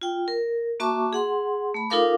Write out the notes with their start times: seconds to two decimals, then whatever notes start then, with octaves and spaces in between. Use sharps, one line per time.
0.02 F4 G5
0.28 A#4
0.80 A#3 F#4 E5 A5 C#6 D6
1.13 G#4 F#5 C6
1.74 A3 B5
1.90 D#4 F4 A4 A#4 F5 D6